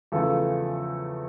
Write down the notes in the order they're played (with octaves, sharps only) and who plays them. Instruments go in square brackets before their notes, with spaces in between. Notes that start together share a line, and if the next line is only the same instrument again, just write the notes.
[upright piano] E2 C#3 F3 A3 A4